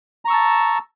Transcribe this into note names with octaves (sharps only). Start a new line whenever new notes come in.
A5 A#5 C#6 E6